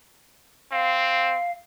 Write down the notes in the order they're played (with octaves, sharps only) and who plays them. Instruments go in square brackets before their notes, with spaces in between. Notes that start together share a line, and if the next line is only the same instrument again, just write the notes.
[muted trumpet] C4 [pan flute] F5